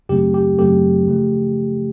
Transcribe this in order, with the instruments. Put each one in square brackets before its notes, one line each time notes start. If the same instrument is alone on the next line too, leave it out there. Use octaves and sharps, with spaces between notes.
[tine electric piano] F#2 C#3 F#3 A3 C4 G4
G4
F#2 C#3 F#3 A3 C4 G4 A4
C#3 F3 A3